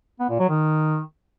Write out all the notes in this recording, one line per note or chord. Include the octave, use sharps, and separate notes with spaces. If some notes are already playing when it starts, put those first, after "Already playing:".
B3
A#2
F#3
D#3